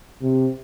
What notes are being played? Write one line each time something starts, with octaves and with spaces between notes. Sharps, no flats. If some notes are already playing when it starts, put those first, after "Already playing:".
C3